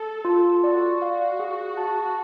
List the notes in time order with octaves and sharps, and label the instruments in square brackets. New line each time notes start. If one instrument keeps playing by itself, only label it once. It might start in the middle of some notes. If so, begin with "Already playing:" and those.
Already playing: [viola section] A4
[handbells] F4
[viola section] F#4 [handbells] D5
[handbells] F5
G#4
A5